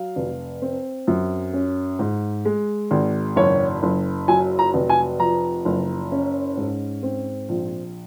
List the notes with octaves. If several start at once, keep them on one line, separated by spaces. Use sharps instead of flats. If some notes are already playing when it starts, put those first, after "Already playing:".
Already playing: F#3 F5
F1
C4
F#2
C#4
G#2
G#3
G#1
F#1 C#5
F#1
F#3 G#5
A#5
F1
G#5
F3 A#5
F#1
C#4
G#2
C4
A#1